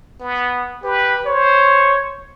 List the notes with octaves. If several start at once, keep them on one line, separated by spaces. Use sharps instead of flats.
B3
G4 B4
C5 C#5